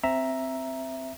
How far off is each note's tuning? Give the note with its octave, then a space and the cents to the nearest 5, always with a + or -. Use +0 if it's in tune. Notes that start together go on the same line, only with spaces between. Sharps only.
C4 +0 E5 +0 A#5 +0